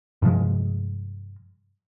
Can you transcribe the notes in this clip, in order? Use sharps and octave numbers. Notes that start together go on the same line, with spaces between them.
G2 C3 F3 G#3